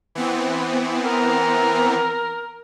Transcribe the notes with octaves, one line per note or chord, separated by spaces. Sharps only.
E3 B3 C4
A#4